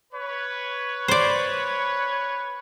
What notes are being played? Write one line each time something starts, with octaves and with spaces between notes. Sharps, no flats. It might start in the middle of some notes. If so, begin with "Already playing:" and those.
B4 C#5
C5 D5